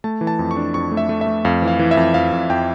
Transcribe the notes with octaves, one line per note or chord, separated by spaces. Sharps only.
A3 A5
E3
A5
F2
C#6
D4
F2 C#6
A3
E5
A3
E5
A3
F2 F5
E3
F5
E3
E5
F2
F2 F5
F2
F2 G5